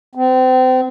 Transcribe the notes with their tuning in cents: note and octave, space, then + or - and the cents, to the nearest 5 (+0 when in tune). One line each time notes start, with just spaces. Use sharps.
C4 -30